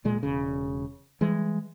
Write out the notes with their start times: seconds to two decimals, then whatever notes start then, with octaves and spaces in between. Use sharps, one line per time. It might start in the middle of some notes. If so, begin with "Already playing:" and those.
0.04 D1 A#2 G#3
0.23 E1 C#3
1.21 E3 G3 G#3